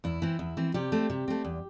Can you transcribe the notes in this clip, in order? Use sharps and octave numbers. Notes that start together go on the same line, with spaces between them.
E2 E4
E3 C4
E2
E3 C4
C3 G3 G4
A3 C4
C3
A3 C4
E2